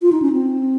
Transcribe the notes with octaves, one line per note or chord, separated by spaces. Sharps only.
F4
D#4
C#4
C4